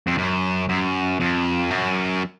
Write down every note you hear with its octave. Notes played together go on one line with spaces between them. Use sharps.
F2
F#2
F#2
F2
F#2